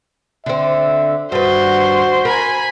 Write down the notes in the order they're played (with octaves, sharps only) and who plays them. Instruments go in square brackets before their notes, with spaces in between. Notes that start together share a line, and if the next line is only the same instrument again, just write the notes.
[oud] D3 C4 [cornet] E5
[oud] G2 B4 [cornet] F#4 [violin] C5
[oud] A#4 [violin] G#5 B5